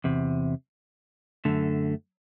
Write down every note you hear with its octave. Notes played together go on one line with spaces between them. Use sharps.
E2 C3
F#2 D3 A3